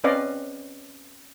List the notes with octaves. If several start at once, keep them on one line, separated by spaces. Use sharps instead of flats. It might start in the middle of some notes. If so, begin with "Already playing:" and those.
C4 C#4 B4 D5 D#5 F5